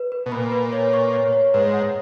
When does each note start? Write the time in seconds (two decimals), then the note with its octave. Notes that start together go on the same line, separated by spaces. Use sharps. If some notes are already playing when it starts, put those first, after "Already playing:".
Already playing: B4
0.12 B4
0.26 B2
0.32 A#2 B5
0.52 B4
0.73 C#5
0.93 C#6
1.14 C#5
1.33 C#5
1.54 G#2 B4
1.73 F#5